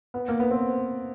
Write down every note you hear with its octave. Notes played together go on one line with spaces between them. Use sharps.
B3
A#3
B3
C4